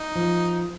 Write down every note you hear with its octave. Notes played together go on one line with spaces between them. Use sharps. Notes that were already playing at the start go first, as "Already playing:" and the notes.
Already playing: D#4
F3